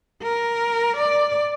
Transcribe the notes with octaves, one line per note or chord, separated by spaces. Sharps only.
A#4
D5